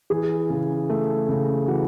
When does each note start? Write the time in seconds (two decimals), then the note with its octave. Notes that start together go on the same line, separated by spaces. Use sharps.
0.10 E3 G#4
0.50 C#3
0.90 A3
1.29 C#3
1.68 E3 F#4